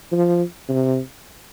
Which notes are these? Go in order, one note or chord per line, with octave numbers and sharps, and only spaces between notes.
F3
C3